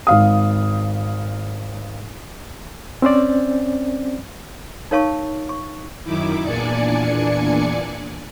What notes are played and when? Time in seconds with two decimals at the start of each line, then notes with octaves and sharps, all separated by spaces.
0.07 G#1 F5 D#6
3.02 C4 C#4 C5 D5
4.91 D#4 A#4 C#5 F5 A5 C#6
5.49 C#6
6.04 F#2 D#3 D#4 E4 D6
6.43 E2 A#2 D4 D5 G#5 C#7